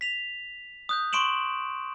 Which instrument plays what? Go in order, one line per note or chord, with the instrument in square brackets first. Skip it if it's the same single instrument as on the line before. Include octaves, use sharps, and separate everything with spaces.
[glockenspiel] B6 F7
D#6 F#6 G6
C6 C#6 D7 E7 F#7